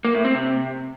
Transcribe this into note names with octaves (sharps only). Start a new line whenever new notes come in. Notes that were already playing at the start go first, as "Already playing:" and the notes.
A#3
A2
C4
C3